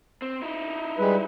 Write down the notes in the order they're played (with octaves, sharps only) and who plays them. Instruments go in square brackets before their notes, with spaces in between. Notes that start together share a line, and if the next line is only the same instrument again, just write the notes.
[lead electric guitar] C4
D#4 E4
[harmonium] G3 G#3 B4